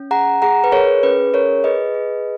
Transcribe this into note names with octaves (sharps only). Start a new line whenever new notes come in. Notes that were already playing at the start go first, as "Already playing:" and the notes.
Already playing: C#4
G#4 F#5 A#5
G#4 F#5 A#5
B4
G#4 A#4 C#5
C#4 B4
G#4 A#4 C#5
G#4 B4 D#5
G#4